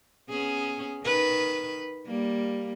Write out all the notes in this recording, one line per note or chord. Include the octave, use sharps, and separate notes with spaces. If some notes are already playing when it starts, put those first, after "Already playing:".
B3 C#4 G#4
D#3 B4
G3 A#3